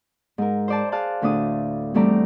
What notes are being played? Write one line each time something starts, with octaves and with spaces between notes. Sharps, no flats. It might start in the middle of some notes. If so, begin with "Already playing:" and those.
G#2 A#4
C5 D5 A5
G#4 D5 F5 A5 F#6
D2 A2 A3 D4 D#6
E2 G3 A3 C4 D5 A#5